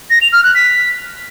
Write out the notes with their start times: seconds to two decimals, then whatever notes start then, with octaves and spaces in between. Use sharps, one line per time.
0.10 A#6
0.21 F7
0.33 F6
0.44 F#6
0.55 B6